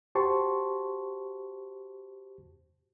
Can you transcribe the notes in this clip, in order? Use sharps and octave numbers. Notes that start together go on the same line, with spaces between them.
F#4 G4 C5 A5 C6 C#6